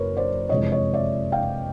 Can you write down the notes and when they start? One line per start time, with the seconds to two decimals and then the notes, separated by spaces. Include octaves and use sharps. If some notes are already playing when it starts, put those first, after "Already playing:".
Already playing: F#1 F#2 A#4 B4 C#5
0.17 C5 D5
0.49 F2 C3 E3 G#3 C#5 D#5
0.72 C#5 D#5
0.94 D5 E5
1.32 F5 G5